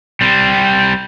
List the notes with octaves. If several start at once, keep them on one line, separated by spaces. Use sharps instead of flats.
G3 C4